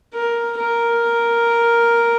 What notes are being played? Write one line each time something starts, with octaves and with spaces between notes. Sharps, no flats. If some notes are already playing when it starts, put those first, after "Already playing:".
A#4
A#4